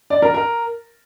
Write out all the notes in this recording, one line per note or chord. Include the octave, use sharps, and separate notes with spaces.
D5
A#4
A#4